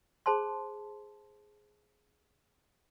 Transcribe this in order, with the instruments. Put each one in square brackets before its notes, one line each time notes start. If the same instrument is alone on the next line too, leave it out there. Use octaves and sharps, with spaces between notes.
[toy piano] G#4 C5 A5 C6